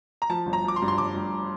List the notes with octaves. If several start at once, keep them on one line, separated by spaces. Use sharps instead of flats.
A#5
F3 A5
G1
A#5
F3 D6
C6
G2
C6
G1 D6
G2